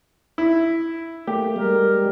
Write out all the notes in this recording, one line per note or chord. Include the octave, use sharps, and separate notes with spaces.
E4
A3 A#3 G4
G3 G#3 A#4